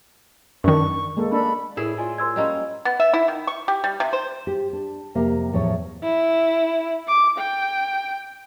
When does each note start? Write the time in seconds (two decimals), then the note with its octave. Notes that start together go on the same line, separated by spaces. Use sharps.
0.64 F#2 D#3 D4 C#6
1.17 G#3 A#3 A4
1.31 A#3 D4 A4 B5
1.77 A2 E4 G#4 A#4 B4 E5
1.97 F4 D5 G#5 D#6
2.18 A#4 C5 D5 C6 E6 G#6
2.36 G3 A#3 C#4 C#5 D#5
2.85 B3
3.00 E5
3.14 E4
3.28 D#3
3.47 C#6
3.68 G4
3.84 G3
4.00 C3
4.13 C5
4.47 G4
4.73 D4
5.15 F2 C3 A#3 G4 A#4 F5
5.52 E2 A2 F3 C#5
6.03 E4
7.08 D6
7.38 G5